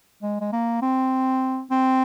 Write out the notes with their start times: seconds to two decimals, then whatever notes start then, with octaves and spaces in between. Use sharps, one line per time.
0.23 G#3
0.41 G#3
0.53 A#3
0.82 C4
1.71 C4